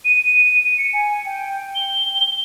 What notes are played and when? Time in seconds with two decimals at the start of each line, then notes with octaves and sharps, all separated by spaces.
0.05 D#7
0.78 C#7
0.93 G#5
1.25 G5
1.75 G7